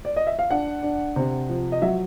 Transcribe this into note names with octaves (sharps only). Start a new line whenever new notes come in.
D5
D#5
E5
F5
D4 F#5
D4
C3
F3
D#5
F#3 E5